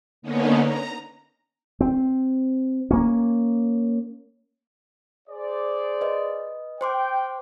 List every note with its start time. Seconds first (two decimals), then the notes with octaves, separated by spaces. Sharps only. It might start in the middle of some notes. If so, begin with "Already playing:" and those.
0.22 D3 A#3 B3 C#4 D#4
0.64 A#5
1.81 C4
2.91 A#3 C#4
5.28 G#4 C5 D5
6.01 B4 D#5
6.81 C5 G5 C6 D6